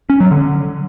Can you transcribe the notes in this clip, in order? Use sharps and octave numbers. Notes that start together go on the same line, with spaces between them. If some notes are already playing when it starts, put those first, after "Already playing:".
C#4
F#3
D3